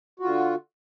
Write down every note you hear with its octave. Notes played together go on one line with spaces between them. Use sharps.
D3 F4 F#4